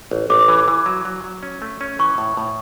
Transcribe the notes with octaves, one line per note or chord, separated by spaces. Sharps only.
A1
A1 D6
E3
E3
F#3
F#3
F#3
C#4
A3
C#4
E3 C#6
A2
A2